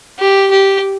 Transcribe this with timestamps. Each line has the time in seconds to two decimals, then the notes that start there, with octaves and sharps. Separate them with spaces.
0.19 G4
0.51 G4